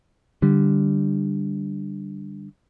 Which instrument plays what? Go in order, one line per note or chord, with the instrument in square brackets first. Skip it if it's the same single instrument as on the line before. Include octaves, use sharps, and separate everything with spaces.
[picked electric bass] D3 G3